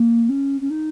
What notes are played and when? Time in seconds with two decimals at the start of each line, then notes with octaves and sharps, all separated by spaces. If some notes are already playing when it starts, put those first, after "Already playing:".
Already playing: A#3
0.29 C#4
0.61 C#4
0.70 D#4